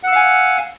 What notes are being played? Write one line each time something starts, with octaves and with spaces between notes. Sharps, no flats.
F5 F#5 G#5 E6